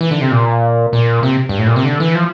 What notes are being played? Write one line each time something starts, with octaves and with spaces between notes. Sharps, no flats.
E3
D3
C3
A#2
A#2
C3
G2
A2
A#2
C3
D3
E3
F3